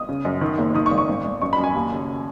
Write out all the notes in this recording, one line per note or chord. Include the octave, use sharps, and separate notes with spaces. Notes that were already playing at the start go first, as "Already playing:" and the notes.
Already playing: D#6
C#3
F#2
D#3
F#1
D#3 D#6
C#6
G#1
C#6
G#1
G#1
F#2 C#6
B5
F#2
G#5
D#2
C#3